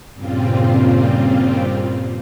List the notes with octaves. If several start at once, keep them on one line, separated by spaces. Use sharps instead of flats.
G2 A#2 C#3 G3 C4 F4